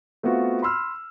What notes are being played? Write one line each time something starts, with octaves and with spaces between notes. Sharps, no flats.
A3 B3 C4 F4 F#4
B5 C6 E6 F6